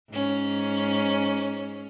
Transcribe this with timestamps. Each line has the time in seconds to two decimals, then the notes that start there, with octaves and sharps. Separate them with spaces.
0.10 G#2 C#4